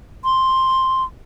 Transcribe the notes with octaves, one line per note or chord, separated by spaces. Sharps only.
C6